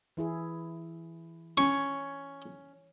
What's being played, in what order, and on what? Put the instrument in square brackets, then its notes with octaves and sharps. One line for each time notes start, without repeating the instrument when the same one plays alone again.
[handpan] E3 E4 G#4
[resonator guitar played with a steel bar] C#4 [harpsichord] C#6